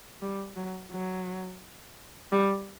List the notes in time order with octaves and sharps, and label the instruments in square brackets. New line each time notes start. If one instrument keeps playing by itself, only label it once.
[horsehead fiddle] G3
F#3
F#3
G3